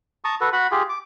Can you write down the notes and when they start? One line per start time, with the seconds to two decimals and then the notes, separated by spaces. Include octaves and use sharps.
0.24 A5 A#5 C#6 D#6
0.41 F#4 A4 B4
0.53 F#4 F#5 B5
0.71 F4 G4 G#4
0.89 D6